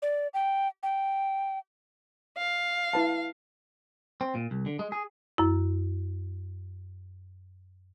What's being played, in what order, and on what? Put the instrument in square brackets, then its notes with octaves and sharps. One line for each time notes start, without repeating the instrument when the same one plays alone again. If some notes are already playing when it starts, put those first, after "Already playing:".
[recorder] D5
G5
G5
[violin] F5
[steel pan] E4 B4 A5
[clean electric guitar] C4
A#2
C2
D3
G#3
G#4
[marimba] F#2 E4